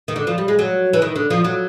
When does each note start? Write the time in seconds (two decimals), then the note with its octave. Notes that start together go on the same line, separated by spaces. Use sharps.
0.08 D#3
0.16 D3
0.27 F3
0.38 G3
0.48 G#3
0.59 F#3
0.93 E3
1.02 D#3
1.16 D3
1.30 F3
1.44 F#3